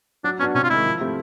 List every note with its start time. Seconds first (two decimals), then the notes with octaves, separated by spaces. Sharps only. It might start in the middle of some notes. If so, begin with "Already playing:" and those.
0.24 F#3 D4
0.39 B3 C#4
0.42 D4 F#4
0.55 C3 C#4
0.64 F4
0.70 D#3 G#3 E4
0.85 F3
1.00 A3 C4 E4 G4